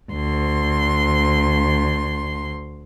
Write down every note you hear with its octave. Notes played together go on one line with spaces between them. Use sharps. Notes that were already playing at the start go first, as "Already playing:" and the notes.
D2 C6